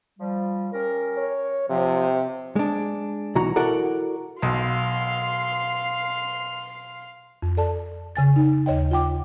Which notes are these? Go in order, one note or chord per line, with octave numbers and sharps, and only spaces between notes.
F3 G3
C#4 G4 A#4
C#5
C3 F3
G#3 D4
B1 E3 F#4 A#5
E4 F#4 A4 A#4 D5 F#5
B1 F5 C6
F2
A4 D5 A5
C#3 G#5 A6
D#4
D#2 C#5 D#5 G5
F4 F#5 G5 D6